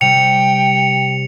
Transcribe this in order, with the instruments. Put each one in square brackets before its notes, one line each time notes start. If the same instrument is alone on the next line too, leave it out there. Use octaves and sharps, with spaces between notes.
[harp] C3 G3 [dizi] G5 [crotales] C#7 F7